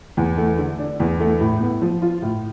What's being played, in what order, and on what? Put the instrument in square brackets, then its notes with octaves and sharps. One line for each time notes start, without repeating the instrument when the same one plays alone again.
[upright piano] E2
A3
D3
D4
E2
A3
A2
B3
F3
F4
A2